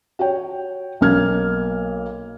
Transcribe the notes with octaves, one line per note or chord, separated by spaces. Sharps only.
F#4 C#5 G5
B1 A#3 F6 G#6